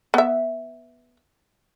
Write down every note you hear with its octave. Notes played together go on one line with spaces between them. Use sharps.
B3 E5